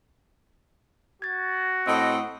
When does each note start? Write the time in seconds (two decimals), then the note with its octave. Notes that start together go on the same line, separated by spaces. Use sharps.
1.22 F#4 G#6 A6
1.87 A2 C4 D#5 F#5